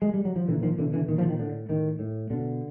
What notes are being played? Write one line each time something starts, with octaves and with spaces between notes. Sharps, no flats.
G#3
G3
F#3
F3
A#2 D3 E3
D#3 F3
B2 D3 E3
D3 E3
A#2 D#3
D#3 F3
D#3
A2 D3
A2 D#3
A2
B2 D3